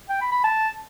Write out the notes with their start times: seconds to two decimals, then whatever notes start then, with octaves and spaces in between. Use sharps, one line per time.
0.09 G5
0.21 B5
0.32 B5
0.44 A5